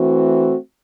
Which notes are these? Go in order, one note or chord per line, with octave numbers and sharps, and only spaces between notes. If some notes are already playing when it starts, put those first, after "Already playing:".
Already playing: E3 A3 C4 F#4